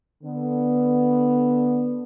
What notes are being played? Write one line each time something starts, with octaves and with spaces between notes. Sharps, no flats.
D3 B3